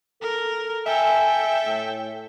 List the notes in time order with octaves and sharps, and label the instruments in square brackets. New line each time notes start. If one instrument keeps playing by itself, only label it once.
[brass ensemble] A4 [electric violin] A#4
[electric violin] A4 G5 [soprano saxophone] E5 [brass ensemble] G#5
[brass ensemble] A2